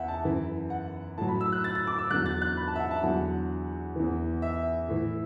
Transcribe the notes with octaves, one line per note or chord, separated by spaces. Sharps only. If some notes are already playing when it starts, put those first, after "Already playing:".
Already playing: E2 E5 F#5
A5
F#2 E3
F#5
A2 F#3 A5
B5
E6
F#6
A6
A6
D6
E6
E2 D3 F#3 F#6
A6
F#6
B5
A5
E5
F#5
A5
E2 D3 F#3 F#5
E2 E3
E5
A2 E3